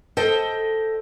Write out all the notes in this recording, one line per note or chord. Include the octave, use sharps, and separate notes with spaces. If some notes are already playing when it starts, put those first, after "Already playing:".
A4 C5 D#5 G5